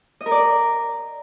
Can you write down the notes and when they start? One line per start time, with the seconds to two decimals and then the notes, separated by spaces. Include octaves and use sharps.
0.21 D#5
0.26 A#4
0.31 D5